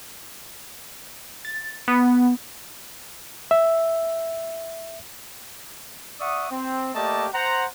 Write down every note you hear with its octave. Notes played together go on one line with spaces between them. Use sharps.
A6
B3
E5
D5 E5 F#5 C#6 D#6
C4
A3 A#3 G4 D5 D#5 A5
C5 F#5 A#5